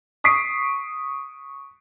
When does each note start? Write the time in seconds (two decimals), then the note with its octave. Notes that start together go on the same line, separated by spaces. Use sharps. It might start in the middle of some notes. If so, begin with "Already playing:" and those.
0.24 C#6 D#6 B6 C7 D7